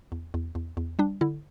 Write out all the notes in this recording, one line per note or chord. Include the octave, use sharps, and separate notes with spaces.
E2
E2
E2
E2
G3 D4
D3 E4